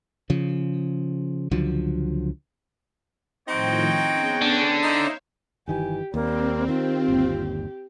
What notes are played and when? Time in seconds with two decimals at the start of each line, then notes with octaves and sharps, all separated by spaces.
0.30 C#3 F3
1.51 C#2 D3 F3 F#3
3.48 A2 D#3 F3 C4 D#4 F#4 C#5 G5
4.11 B3 C#4 G#4
4.42 D3
4.83 D#4 E4 C5 C#5 E5 F5
5.68 G1 D#3 E3 G4 G#5
6.14 D#2 G3 A#3 C4
6.68 D#3 F4 G4
7.08 G1 D#2